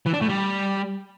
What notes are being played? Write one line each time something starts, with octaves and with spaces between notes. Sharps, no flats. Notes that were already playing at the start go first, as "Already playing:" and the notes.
E3
D4
A2
G3